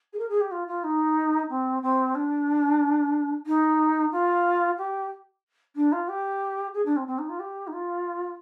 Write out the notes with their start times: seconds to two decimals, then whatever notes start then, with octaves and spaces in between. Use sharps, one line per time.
0.13 G#4
0.18 A#4
0.29 G#4
0.40 G4
0.51 F4
0.67 F4
0.83 D#4
1.49 C4
1.82 C4
2.15 D4
3.46 D#4
4.12 F4
4.78 G4
5.76 D4
5.92 F4
6.08 G4
6.74 G#4
6.85 D4
6.96 C4
7.07 C4
7.18 D#4
7.29 F4
7.39 G4
7.67 D#4
7.72 F4